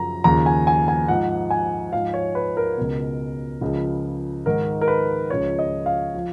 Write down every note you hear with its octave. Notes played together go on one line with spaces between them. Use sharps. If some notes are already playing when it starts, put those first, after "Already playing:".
Already playing: F#2 C#3 F3 A#5
D#2 C#3 F3 A#5
G#5
G#5
G#5
G#2 F3 F#5
G#5
G#2 F3 F5
C#5
B4
A#4
C#2 B2
C#2 C#3 F3
G#2 D#3 A#4
A#4
B4
C#2 C#3 F3 C#5
D#5
F5
F3